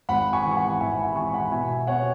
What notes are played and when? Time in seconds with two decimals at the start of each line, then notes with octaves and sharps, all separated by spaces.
0.09 G#1 F#5 B5
0.33 G#5 C#6
0.45 E3
0.51 C#6
0.56 F#5 B5
0.68 F#5
0.80 G#1 E5 G#5
0.98 F#5 B5
1.16 E3 G#5 C#6
1.29 C#6
1.34 F#5 B5
1.52 B2 E5 G#5
1.87 B2 C#5 F#5